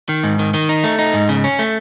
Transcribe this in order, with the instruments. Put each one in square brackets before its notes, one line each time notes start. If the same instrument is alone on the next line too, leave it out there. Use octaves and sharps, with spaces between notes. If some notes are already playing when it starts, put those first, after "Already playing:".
[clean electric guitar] D#3
G#2
D#3
D#3
D#4
A3
D#4
G#2
C#3
C#4
A3